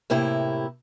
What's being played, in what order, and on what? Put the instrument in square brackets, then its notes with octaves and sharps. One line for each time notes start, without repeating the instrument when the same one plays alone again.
[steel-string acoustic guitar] A2 C3 A#3 E4 G4